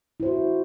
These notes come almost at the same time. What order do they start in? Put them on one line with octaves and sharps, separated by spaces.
E4 C5 F#4